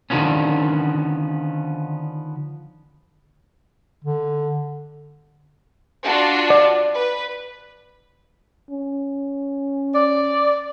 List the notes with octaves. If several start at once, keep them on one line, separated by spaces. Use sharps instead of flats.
D3 D#3 F3 B3 C#4
D3
D4 F4 F#4
D5
B4
C#4
D5